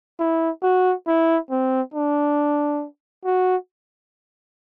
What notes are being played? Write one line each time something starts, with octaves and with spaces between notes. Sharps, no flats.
E4
F#4
E4
C4
D4
F#4